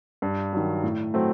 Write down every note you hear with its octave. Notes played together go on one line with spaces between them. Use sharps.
G2
D#3 F#3
A2
F#3 A3 C4